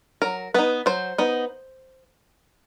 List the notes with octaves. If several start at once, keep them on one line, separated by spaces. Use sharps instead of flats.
F#3 A#4
B3 D#4 B4
F#3 C5
B3 D#4